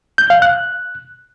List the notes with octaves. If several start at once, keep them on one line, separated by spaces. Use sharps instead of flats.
G6
F5
F#6